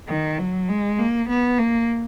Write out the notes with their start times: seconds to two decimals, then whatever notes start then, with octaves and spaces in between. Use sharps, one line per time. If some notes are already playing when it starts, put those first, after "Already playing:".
0.09 D#3
0.38 F#3
0.69 G#3
0.99 A#3
1.29 B3
1.59 A#3